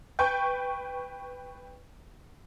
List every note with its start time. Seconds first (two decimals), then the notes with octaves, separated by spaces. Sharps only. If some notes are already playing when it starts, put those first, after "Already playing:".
0.19 B4 G5 C#6 G6